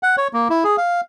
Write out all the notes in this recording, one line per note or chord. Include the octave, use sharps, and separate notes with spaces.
F#5
C#5
A#3
E4
G#4
F5